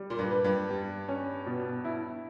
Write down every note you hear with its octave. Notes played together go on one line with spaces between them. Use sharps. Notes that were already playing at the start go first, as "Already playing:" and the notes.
Already playing: G3
A#2
G2
B4
G2
G3
C#4
B2
E4